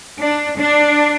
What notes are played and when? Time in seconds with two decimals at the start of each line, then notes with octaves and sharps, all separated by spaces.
0.19 D4
0.57 D4